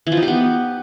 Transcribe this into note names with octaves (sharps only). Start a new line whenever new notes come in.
E3
F3
D#4
G4
B3